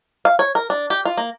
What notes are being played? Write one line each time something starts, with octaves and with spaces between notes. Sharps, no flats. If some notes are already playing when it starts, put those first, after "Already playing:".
F5
C#5
A#4
D4
G4
F4
A#3